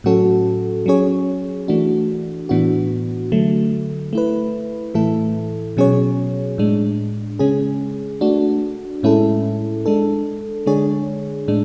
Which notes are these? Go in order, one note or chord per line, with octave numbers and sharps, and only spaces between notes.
A2 F#3 C#4 F#4 A4
F#3 C#4 G#4 C#5
E3 A3 D4 F#4
A2 E3 B3 D4 F#4
D3 F#3 A3
A3 E4 B4
A2 E3 A3 E4 A4
B2 F#3 C#4 G#4 C#5
A2 G#3 D4
C#3 G#3 C#4 G#4
A3 D4 F#4
A2 G#3 C#4 E4 A4
G#3 D4 A4
D3 G#3 D4 G#4 C#5
A2 G#3 D4